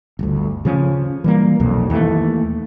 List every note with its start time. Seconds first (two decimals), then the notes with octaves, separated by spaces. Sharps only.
0.19 G1 D2
0.65 C#3 F3 C#4
1.24 E3 G3 A#3
1.60 B1 F2 A#2
1.90 D#2 E3 F3 A3